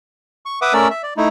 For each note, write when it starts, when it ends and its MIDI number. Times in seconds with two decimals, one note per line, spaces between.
0.46 0.59 85
0.62 0.73 71
0.62 0.73 76
0.62 0.73 78
0.62 0.73 86
0.62 0.73 87
0.73 0.88 57
0.73 0.88 61
0.73 0.88 70
0.73 0.88 74
0.73 0.88 88
0.90 1.02 76
1.03 1.14 74
1.17 1.28 57
1.17 1.28 63
1.17 1.28 64